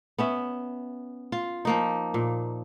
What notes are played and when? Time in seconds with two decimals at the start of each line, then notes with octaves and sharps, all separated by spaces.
0.18 B3 C#4 E5
1.32 F4
1.65 F3 A#3 D#4
2.14 A#2